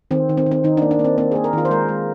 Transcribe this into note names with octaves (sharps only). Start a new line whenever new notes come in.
D#3 C4
D#3
C4
D#3
C4
D#3 D#4
D4
A#3
D4
A#3
C4
A#3 C4
G#4
A#3
A#4
D#3 F4
C5
G#3 A#4
G#3